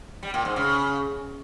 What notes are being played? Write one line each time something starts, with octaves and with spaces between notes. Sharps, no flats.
G3
A#2
G#2
C#3